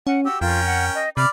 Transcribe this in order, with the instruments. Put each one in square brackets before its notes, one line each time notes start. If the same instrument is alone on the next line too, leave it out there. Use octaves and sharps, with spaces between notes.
[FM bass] C#4 [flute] F#5
[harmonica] F#4 G4 [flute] E6
[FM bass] F2 [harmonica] C#4 A#4 G5 [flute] F4
[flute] F#5
D#5
[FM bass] C3 [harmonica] D5 B5 D6 [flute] F6